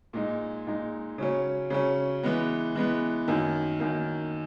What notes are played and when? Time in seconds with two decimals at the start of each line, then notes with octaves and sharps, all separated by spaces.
0.13 A#2 G#3 D#4
0.66 A#2 G#3 D#4
1.18 C#3 F#3 C#4
1.70 C#3 F#3 C#4
2.23 E3 G#3 B3
2.76 E3 G#3 B3
3.28 F#2 D#3 A#3
3.80 F#2 D#3 A#3